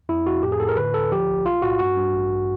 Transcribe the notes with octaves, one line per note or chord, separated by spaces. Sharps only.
F2 E4
F2 F#4
A2 G4
G#4
A2 A4
A#4
D3 B4
D2 A4
F3 G4
A#1
B1 F4
A2 F#4
G2 F#4
G2
A1